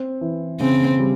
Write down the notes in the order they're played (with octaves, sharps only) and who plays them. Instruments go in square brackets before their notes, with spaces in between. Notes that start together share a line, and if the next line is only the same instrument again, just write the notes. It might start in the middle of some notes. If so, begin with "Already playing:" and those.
Already playing: [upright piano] C4
E3
[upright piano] C#3 [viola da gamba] C4
[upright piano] G3